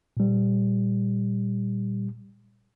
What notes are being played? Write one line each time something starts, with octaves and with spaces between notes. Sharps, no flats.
A#2 G3